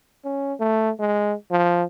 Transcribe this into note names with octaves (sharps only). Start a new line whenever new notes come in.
C#4
A3
G#3
F3